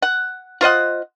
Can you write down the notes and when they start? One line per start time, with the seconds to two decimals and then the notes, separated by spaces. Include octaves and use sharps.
0.02 F#5
0.61 F4 C5 D#5 F#5